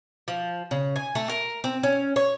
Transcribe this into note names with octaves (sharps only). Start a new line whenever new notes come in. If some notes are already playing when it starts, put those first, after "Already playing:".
F3
C#3
G#5
A3
A#4
C4
C#4
C#5